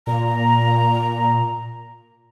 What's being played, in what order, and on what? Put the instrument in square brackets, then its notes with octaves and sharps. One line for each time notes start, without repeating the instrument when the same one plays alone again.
[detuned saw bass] A#2 [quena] A#5